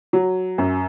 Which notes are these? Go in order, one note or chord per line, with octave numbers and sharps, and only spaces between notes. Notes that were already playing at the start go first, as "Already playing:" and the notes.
F#3
F#2